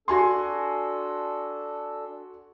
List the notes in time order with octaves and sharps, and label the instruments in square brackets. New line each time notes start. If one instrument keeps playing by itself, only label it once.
[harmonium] D4 A4 [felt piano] F#4 G#5 C6